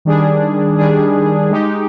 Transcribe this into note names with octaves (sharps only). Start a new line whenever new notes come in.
D#3 G3 D4 G#4
D#3 G3 D4 G#4
G#3 D#4 G4